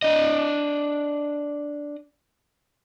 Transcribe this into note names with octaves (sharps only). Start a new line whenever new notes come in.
D4 D#5